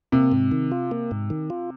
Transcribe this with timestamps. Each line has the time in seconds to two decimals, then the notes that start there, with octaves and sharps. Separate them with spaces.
0.12 C3 A#3
0.32 G#2
0.51 D#3
0.72 F4
0.91 A#3
1.11 G#2
1.30 D#3
1.50 F4